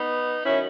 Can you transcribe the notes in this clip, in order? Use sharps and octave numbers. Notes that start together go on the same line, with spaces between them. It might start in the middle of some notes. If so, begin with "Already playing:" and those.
Already playing: B3 D#4
D#3 F#3 C#4 E4